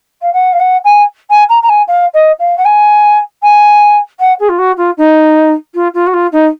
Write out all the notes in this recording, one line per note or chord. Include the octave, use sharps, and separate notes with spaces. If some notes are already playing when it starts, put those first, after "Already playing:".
F5
F#5
F5
F#5
G#5
G#5
A#5
A#5
G#5
F5
D#5
F5
F#5
G#5
G#5
F#5
G#4
F4
F#4
F4
D#4
F4
F4
F#4
F4
D#4